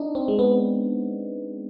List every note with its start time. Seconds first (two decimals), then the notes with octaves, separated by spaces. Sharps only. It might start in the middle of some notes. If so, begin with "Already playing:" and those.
Already playing: D4 D#4
0.15 C4
0.28 G#3
0.39 B3